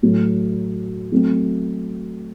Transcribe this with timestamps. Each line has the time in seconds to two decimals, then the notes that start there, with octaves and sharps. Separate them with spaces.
0.02 A2 F#3 A3
1.12 F#3 A3 C4